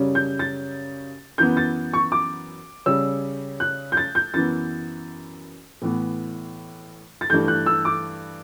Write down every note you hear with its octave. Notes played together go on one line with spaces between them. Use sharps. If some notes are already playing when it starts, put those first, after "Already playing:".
Already playing: F#2 C#3 G3 C#4
G6
A6
F#2 E3 B3 G6
A6
C#6
D6
C#3 G3 C#4 E6
F#6
G6
A6
G6
F#2 E3 B3 A6
A2 E3 B3
A6
G2 E3 A3 G6
F#6
E6
D6